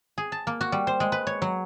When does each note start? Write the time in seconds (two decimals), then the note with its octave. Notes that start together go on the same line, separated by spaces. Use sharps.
0.18 G#4
0.32 A5
0.47 A#3
0.61 F#4
0.72 G3
0.87 C5
1.00 G#3
1.12 B4
1.27 C#5
1.42 F#3